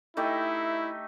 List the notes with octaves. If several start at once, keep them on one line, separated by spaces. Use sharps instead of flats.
A3 D#4 E4 G4